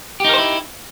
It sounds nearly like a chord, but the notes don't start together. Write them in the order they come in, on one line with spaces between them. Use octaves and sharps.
G4 D#4 A#4 C5 E4